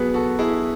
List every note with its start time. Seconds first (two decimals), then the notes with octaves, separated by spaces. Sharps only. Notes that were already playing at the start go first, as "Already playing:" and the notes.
Already playing: B2 F#3 B3 G#4 B4
0.14 F#4 A4
0.39 E4 G#4